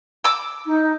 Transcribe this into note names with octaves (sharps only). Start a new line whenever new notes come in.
D6 E6
D#4